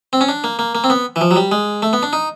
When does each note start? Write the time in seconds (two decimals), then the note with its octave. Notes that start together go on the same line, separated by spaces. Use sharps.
0.13 C4
0.21 C#4
0.29 D4
0.44 A#3
0.59 A#3
0.75 A#3
0.84 C4
0.90 B3
1.16 E3
1.21 F3
1.31 F#3
1.36 G3
1.52 G#3
1.82 A3
1.93 B3
2.03 D4
2.13 D#4